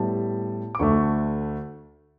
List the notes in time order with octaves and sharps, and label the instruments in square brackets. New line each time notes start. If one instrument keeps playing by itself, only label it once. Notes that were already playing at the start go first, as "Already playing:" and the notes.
Already playing: [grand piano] A2 G3 B3 A5
D6
D2 D3 A3 C#6